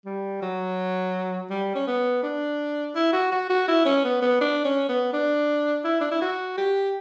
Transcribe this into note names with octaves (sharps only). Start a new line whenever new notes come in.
G3
F#3
G3
C#4
B3
D4
E4
F#4
F#4
F#4
E4
C#4
B3
B3
D4
C#4
B3
D4
E4
D4
E4
F#4
G4